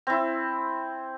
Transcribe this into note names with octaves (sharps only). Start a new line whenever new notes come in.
C4 E4